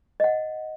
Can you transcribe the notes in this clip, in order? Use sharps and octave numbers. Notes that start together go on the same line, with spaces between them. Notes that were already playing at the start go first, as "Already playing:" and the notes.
D#5
F#5